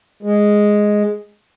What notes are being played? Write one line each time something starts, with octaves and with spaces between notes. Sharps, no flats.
G#3